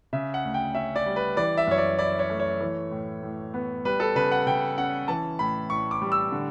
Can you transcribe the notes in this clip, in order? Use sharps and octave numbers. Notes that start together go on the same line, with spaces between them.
C#3 E5
F#5
D2
G5
C#4 E5
D5
G3
B4
E3 D5
E5
F#2 C#5
D5
E4 D5
C#5
A3
C#5
E3
A2
A2
B3
G3 B4
A4
C#3 B4
F#5
C#3 G5
C#4 F#5
E3 A5
A2 B5
A2 C#6
D6
G3
E6
D3